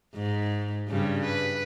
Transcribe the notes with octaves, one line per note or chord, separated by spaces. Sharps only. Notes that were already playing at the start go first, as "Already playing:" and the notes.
G#2
G2 C#3 G3
B4